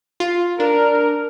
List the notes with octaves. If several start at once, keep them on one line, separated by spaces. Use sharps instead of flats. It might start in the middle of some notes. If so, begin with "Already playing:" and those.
F4
D4 A#4